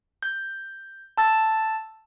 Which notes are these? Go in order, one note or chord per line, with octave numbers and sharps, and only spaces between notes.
G6
A5 E6 A6